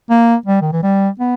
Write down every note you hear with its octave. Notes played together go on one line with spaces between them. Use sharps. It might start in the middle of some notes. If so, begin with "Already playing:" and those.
A#3
G3
D#3
E3
G3
B3